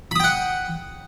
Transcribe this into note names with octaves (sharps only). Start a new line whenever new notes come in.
F#5 G5 B5 D#6